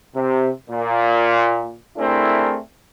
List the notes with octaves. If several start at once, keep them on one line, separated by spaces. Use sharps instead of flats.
C3
A#2
A3 C4 D4 E4 G#4 A#4